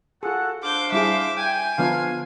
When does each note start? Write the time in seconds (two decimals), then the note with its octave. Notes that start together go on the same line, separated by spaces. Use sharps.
0.23 F4 F#4 G#4 A4 F#5
0.63 D4 C5 F5 D6 G6
0.92 G3 E4 G#4 E5 D6
1.37 G5 G#5
1.78 D3 F3 B3 D4 F4 F5